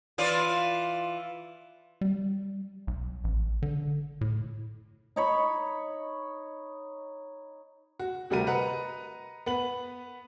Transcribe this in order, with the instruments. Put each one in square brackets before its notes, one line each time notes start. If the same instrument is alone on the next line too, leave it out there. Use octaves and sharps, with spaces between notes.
[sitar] E3 F4 D5
[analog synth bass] G3
B1
A1
D3
A2
[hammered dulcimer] D#4 C#5 B5
[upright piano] F#4
D2 C3 G3 F#4 A#4 D#7
B4 D#5 F#5 A#5
B3 B4 F#7